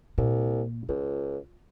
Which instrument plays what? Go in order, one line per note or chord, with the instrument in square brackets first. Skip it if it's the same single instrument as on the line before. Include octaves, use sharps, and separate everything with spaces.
[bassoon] C2 [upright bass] A#2
[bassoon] C#2 [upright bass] F4